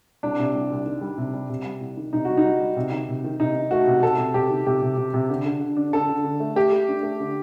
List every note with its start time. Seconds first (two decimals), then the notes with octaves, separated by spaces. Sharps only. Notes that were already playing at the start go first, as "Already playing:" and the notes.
0.23 C2 D4
0.39 C3
0.54 C2
0.71 C2
0.86 D#3
1.01 G3
1.18 C3
1.34 G3
1.49 C3
1.65 G3
1.81 C2
1.97 D#3
2.13 C3 D#4
2.25 G3 F#4
2.37 D#4
2.44 G3
2.60 G3
2.76 C3
2.91 D#3
3.08 C3
3.24 D#3
3.40 C3 D#4
3.56 D#3
3.71 A3 F#4
3.87 C3
4.03 C3 A4
4.18 C3
4.34 C3 G4
4.51 D#3
4.67 C3 G4
4.82 C3
4.97 C3
5.14 C3
5.30 D3
5.46 D3
5.61 D3
5.77 D4
5.93 D3 A4
6.09 D3
6.24 D3
6.40 A3
6.56 A3 G4
6.72 A3
6.88 D4
7.03 A3
7.20 D3